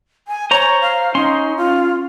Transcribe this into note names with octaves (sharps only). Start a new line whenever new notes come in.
G#5
C5 C#5 A#5 C#6
F5
C#4 D#4 C6
F4